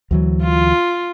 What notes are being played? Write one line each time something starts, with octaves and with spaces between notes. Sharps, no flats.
D2 E3 F#3
F4